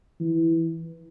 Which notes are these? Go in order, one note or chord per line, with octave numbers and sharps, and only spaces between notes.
E3